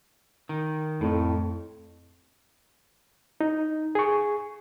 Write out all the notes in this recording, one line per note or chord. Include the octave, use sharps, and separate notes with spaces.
D#3
F2 A2
D#4
G#4 C#6